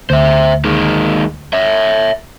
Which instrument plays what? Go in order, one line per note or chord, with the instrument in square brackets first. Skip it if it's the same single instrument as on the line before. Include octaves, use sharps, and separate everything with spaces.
[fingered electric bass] D2 [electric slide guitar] C5 E5
[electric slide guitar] D#3 G#3 A#3
C#5 E5